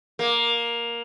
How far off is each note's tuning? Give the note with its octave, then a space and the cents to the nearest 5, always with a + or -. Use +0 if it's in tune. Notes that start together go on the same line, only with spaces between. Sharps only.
A#3 +10